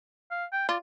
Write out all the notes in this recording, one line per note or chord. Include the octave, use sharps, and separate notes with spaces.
F5
G5
F4 D5